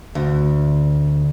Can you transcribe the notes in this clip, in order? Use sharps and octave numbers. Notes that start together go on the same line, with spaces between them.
D2